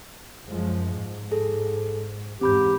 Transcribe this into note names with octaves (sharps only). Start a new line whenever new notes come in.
F#2 F3 G#3
G#2
G#4 A4
E2 G#2 C4 G4 B5 G6